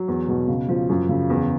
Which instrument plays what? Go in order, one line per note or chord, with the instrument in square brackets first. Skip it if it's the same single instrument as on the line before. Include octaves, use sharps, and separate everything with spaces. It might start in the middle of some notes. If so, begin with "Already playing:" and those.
Already playing: [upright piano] F#3
E2
B2
C#3
F3
F#2
C#3
E2